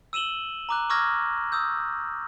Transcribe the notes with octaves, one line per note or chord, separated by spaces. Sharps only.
E6 D#7 E7 F#7 G7
A#5 D6 F#6
C#6 D6 E6 F6 G#6 A#6
D#6 E6 G6